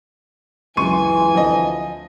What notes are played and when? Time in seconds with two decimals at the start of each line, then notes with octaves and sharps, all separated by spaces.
0.77 C#2 F#2 E3 G#5 C6 C#6 D#7
1.35 D2 F3 D#5